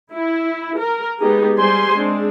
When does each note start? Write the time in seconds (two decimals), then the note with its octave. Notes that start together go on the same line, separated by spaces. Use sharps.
0.13 E4
0.79 A#4
1.19 G#3 B3 D#4 G4 G#4
1.57 G3 G4 G#4 C5 G#5 C6
1.94 G#3 C4 D4